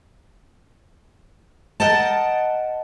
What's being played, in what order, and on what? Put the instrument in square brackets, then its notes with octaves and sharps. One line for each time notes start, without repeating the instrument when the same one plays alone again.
[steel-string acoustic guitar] A#4 D#5 F#5 G5 A5